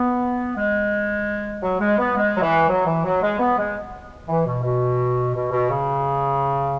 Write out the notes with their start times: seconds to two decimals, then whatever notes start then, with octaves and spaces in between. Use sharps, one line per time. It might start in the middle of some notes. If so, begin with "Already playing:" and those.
Already playing: B3
0.56 G#3
1.62 F#3
1.80 G#3
1.98 B3
2.16 G#3
2.36 F#3
2.42 E3
2.69 F#3
2.86 E3
3.04 F#3
3.22 G#3
3.39 B3
3.58 G#3
4.28 E3
4.46 B2
4.64 B2
5.34 B2
5.52 B2
5.70 C#3